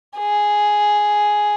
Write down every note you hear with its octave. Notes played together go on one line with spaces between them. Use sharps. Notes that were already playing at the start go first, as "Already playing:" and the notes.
G#4